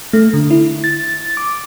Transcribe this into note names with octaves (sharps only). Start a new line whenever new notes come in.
A3
D3
E4
A6
D6